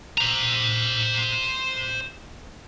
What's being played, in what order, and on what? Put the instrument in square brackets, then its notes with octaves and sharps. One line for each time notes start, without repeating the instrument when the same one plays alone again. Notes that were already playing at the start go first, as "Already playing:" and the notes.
[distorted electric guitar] C5 A#5